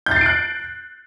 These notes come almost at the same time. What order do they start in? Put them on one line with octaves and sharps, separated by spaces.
G6 A6 C7 D7 F#6